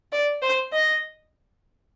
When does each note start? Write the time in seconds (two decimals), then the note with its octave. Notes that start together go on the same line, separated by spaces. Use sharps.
0.12 D5
0.42 C5
0.72 D#5